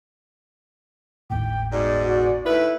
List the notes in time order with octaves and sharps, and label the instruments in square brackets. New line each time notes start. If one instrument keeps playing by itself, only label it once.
[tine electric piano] G#1 D#2 A2 [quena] G5
[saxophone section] G#2 B2 [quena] D5
[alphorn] F#4
[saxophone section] D#2 A2 B4 [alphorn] E4